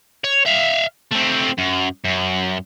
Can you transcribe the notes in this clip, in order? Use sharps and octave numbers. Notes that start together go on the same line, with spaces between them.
C#5
E5 F5
A3 C4
F#2
F#2